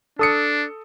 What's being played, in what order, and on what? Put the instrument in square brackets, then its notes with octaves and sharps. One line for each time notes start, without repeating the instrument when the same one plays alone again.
[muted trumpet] D4 [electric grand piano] A4 D#6 C#7